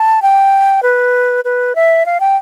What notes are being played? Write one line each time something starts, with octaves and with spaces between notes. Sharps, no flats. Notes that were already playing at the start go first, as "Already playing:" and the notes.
Already playing: A5
G5
B4
B4
E5
F5
G5